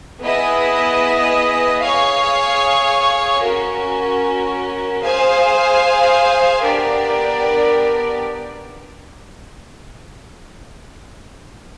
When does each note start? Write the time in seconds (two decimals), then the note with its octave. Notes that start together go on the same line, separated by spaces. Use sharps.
0.21 B3 E4 G#4 B4 D#5
1.82 G#4 C#5 F5
3.41 C#4 F#4 A#4
5.02 G#4 C5 F5 G#5
6.62 B3 D4 G4 A#4 D5